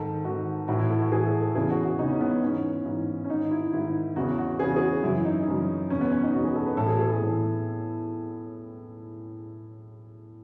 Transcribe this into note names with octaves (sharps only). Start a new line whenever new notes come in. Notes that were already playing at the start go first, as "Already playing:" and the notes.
Already playing: G#2 D#3 A4
G#2 D#3 F#4
A2 E3 F#4
E4
A4
F#4
A2 E3 G#4
A4
A4
E2 C#3 E3 G#4
F#4
F#4
E2 C#3 E3 D#4
C#4
B3
B3
G#2 E3 C#4
G#2 E3
C#4
G#2 D#3 D#4
E4
G#2 D#3 E4
E2 C#3 E3 F#4
F#4
E2 C#3 E3 G#4
G#4
F#4
F#2 C#3 E3 E4
D#4
F#2 C#3 E3
E2 B2 C#4
B3
C#4
D#4
E2 B2 F#4
G#4
A4
B4
A2 E3 A4
G#4
G#4
A4
A2 E3